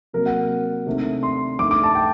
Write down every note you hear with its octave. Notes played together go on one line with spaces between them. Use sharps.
C3 F#3 A#3 A#4
F#5
C3 D#3 A3 D4
C6
G2 D#3 A3 D6
D6
A5
G5